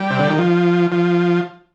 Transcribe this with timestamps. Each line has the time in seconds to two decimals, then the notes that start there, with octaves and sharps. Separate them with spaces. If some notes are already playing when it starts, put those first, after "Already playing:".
Already playing: G3
0.10 C3
0.19 D3
0.29 D#3
0.38 F3
0.92 F3